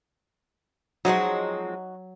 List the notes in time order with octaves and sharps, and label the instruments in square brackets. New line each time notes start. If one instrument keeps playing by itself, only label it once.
[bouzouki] F3 G#3 C4 [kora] F#3 [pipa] D#4 F#4